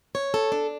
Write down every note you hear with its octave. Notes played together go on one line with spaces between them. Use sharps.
C#5
A4
D4